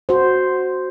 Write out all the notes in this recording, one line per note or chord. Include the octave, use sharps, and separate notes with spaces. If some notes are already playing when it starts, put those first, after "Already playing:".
F#4 C5